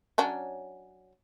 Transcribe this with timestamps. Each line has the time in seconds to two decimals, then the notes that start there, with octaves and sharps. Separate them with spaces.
0.18 F#3 C#4 D4